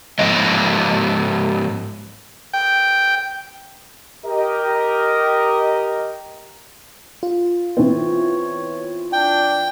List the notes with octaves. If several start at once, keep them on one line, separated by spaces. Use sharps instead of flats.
G#2 F3 D#5
G5
G4 A#4 D#5
F4
E3 B3 C4 C#5
D4 G5